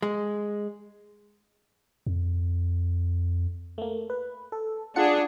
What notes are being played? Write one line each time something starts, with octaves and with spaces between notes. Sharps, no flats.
G#3
F2
A3 A#3
B4
A4
D4 F4 G#4 F#5 C#7